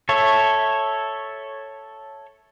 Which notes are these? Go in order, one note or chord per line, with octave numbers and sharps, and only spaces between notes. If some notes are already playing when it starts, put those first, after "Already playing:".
A4 C#5 E5